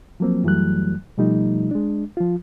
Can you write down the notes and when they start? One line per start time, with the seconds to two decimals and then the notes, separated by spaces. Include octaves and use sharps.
0.20 F3 F#3 A#3 C4
0.44 F#2 E3 F#3 G3 A3 F#6
1.18 B2 F3 G3 A3 D#4
1.71 G#3 D4
2.17 F3 F4